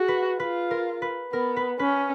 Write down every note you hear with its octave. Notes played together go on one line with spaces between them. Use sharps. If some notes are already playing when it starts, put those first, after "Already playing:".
Already playing: F#4 G#4
B4
F4 B4
A#4
B4
B3 A#4
B4
C#4 B4